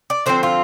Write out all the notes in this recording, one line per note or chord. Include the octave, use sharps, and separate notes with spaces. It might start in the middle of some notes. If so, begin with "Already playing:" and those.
D5
D3 F3 A3 C4 C5
F4